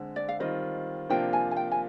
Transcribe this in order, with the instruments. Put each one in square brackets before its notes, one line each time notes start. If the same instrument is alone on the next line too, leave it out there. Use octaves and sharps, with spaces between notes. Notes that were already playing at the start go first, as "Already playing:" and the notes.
Already playing: [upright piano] D3 G#3 C4
[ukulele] D5
F5
[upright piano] D#3 G3 C4 F4 [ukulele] D#5
[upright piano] C3 F3 A#3 D4 F4 [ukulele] G5
[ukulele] G#5
G#5
G5
G#5